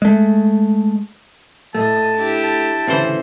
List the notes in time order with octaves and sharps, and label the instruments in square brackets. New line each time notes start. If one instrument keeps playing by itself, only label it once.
[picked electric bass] G#3 A3
[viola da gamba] A2 D#5 [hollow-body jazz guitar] A3 [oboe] A5
[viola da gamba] D4 E4 G4
[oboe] A5
[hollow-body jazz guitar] D2 C#3 [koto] A2 E3 C5